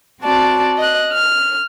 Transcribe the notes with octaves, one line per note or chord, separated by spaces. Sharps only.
C4 F#4 D5 A5
D#5 F#6
F6